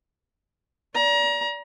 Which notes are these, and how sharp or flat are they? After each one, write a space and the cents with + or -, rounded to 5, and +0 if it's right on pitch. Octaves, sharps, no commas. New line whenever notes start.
D5 -25 A#5 +30